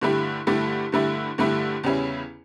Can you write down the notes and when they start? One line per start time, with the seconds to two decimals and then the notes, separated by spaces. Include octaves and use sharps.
0.02 G2 D3 A3 E4 G4
0.47 G2 D3 A3 E4 G4
0.92 G2 D3 A3 E4 G4
1.38 G2 D3 A3 E4 G4
1.83 E2 C#3 G3 C#4 E4